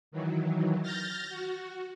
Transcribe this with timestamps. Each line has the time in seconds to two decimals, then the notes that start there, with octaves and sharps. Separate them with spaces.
0.11 D#3 E3 F#3
0.83 F6 G6 A6 A#6
1.29 F#4